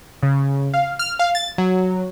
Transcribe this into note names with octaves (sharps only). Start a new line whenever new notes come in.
C#3
F5
F6
F5
A6
F#3